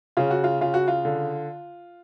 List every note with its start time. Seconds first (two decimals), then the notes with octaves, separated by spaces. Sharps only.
0.17 C#3 F4
0.31 F#4
0.44 F4
0.61 C#3 F4
0.74 F#4
0.88 F4
1.05 D3